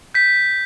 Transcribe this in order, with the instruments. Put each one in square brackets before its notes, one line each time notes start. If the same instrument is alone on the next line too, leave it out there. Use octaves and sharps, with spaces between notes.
[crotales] G6 B6